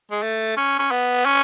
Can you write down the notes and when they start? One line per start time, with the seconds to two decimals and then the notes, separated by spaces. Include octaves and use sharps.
0.12 G#3
0.22 A3
0.57 C#4
0.79 C#4
0.91 B3
1.26 C#4